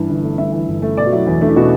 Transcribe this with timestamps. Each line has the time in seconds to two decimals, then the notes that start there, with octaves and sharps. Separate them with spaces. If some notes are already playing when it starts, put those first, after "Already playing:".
Already playing: G2 E3
0.09 G1
0.23 A3
0.38 G2 E5
0.52 E3
0.68 G1
0.82 A3
0.97 B2 D5
1.07 F#4
1.12 F#3 E4
1.26 E2 E4
1.41 A3 D4
1.49 E4
1.56 B2 F#4